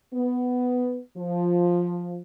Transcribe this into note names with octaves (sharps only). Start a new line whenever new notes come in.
B3
F3